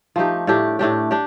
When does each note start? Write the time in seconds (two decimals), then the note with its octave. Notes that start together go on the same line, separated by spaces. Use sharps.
0.16 F3 A3 D#4 G4
0.47 A2 A3 D4 G4
0.79 A2 A3 D4 G4
1.11 D4 G4